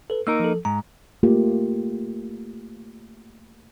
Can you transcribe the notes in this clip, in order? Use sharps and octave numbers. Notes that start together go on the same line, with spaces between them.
A4 B4
A#3 D#4 A#4 E6
F3 A4
G#2 A#5
A3 A#3 F4 G4